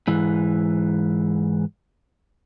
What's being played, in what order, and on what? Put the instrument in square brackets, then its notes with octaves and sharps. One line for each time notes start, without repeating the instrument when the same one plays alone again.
[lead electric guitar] G#2 E3